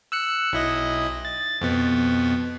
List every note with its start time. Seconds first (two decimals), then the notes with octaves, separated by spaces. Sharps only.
0.12 E6 F#6 C#7
0.53 B1 E4 D#5
1.25 A6
1.61 F2 B2 B3